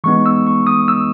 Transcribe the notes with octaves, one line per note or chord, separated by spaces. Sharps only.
E3 G#3 B3 D#4 C#6
E6
C#6
D#6
E6